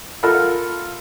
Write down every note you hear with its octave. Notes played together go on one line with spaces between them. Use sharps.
F4 A4 A#4 F#5 B5